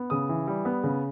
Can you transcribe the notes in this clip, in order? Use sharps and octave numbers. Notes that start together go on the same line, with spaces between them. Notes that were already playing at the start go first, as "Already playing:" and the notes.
Already playing: B3
C#3 D#6
E3
G3
B3
C#3